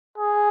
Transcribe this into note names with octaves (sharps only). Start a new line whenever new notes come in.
G#4